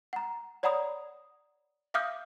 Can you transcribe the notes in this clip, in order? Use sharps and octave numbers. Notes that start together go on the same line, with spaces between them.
F#5 A#5
C#5 D5 F#5 A#5 B5 D#6
E5 F5 D6 D#6 F6 G6